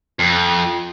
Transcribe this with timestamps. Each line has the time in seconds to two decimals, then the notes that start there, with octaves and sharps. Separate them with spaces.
0.19 F2